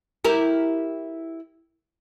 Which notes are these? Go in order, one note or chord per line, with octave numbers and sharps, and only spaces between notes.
E4 G4 A#4